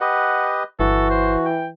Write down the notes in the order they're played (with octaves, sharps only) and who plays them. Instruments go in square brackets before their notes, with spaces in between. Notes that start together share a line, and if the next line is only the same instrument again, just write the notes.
[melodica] G4 B4 D#5 [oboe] F#5
[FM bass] G1 [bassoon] E3 [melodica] F#4 [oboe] A4
[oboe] C5
G5